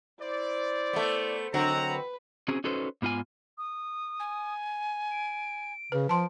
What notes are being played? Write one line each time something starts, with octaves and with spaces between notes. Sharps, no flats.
E4 C5 D5
A3 B3
D3 F#3 C4 F#4 F#5 A#5
B4
C4 C#4 F#4 G#4
C#4 D#4 F#4 A4 B4 C5
G#2 B3 F4 A4 G#5
D#6
G#5
D7
C#3 B4
F3 A5 C6 D7